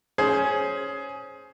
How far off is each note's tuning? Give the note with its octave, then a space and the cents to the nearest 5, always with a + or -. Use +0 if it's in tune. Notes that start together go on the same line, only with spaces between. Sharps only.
C#4 +0 G#4 +15 C5 +0